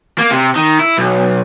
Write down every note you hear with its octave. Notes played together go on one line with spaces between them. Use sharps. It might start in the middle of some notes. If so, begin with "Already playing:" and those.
A#3
C3
D#3
E4
B1